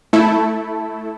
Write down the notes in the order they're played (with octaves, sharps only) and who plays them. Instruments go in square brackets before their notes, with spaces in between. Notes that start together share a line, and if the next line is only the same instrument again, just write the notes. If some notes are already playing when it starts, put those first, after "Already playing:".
[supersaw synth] A3 E4 A4